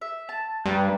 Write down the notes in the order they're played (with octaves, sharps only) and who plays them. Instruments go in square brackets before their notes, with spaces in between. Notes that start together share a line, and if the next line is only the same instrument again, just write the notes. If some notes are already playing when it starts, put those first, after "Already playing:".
[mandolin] E5
A5
[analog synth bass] G2 [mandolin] B4 G5 A#5